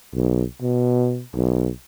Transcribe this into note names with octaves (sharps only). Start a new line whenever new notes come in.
B1
B2
B1